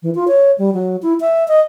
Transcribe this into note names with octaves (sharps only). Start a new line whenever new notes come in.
E3
F4
C#5
G3
F#3
E4
E5
D#5